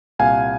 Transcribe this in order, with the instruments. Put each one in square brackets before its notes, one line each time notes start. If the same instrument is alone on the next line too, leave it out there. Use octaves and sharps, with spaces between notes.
[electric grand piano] C2 A#2 F5 G#5